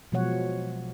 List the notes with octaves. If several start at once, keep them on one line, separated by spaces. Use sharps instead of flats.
B2 F3 F#3 G#3 C#5 F#5